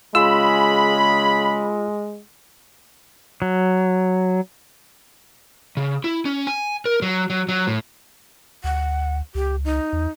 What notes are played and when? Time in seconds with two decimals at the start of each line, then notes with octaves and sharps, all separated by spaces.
0.15 C#3 G#3 F4 G#4 B5 E6
3.42 F#3
5.77 C#3
6.04 E4
6.25 C#4
6.47 G#5
6.85 A#4
7.02 F#3
7.30 F#3
7.49 F#3
7.67 A2
8.64 D2 F#5
9.35 C#2 G4
9.65 D#4
9.93 E2